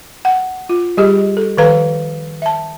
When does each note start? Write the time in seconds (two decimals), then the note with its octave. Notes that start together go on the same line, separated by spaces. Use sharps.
0.25 F#5
0.69 F4
0.97 G3 G4 G#4 D#5
1.37 A4
1.58 D#3 F3 A4 B4 F5 A#5
2.42 E5 A5